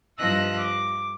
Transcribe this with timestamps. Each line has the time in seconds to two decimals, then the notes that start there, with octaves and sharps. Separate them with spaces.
0.19 G2 F3 D#5 E6 F#6 A#6
0.59 D6